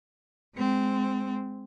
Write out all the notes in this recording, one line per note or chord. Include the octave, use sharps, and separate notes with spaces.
G#3 C4